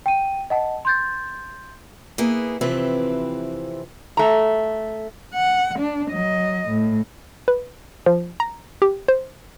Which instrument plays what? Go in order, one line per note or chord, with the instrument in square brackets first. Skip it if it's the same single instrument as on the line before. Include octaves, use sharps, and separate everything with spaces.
[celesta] G5 D#7
D#5 F#5 A5
C6 G6 A6
[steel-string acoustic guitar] A#3 B3 E4 G#4
C3 E3 F3 C4 E4 B4
[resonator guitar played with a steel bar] A3 A#5
[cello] F#5
D4
F#3 D#5
A2
[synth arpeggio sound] B4
F3
A#5
G4
C5